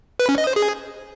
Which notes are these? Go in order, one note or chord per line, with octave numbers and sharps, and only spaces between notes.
B4
C#4
D#5
C5
G#4